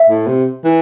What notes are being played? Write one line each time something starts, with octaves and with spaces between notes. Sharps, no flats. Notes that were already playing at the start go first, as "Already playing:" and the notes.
Already playing: E5
A2
C3
E3